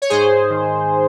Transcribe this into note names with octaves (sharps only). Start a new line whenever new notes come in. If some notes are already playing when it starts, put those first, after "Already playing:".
C#5
G#2 G#4 C5
D#3